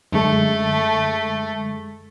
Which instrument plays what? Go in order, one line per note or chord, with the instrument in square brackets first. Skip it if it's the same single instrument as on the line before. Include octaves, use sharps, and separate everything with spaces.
[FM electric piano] F#2 D3 G#3 [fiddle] A3